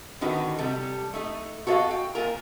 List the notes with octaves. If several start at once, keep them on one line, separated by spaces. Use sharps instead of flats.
D3 D#3 D#4 F#4 B4
C3 G3 A4
A3 D#4
F#4 A4 C#5 D#5 F5
G5
A#2 F4 A#4 A#5